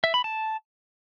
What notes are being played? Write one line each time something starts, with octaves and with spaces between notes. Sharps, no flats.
E5
B5
A5